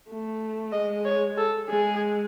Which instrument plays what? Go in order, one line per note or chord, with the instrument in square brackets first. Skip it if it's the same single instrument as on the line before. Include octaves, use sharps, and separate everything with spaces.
[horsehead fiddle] A3
[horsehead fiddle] G#3 [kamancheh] D#5
[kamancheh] C#5
A4
[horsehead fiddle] G#3 [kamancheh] G#4